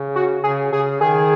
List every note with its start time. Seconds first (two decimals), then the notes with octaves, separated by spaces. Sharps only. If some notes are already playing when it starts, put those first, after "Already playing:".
Already playing: C#3
0.16 F#4
0.44 C#3 G#4
0.73 C#3 G#4
1.01 D#3 G#4